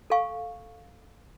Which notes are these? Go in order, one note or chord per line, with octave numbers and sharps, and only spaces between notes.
A4 F5 G#5 C#6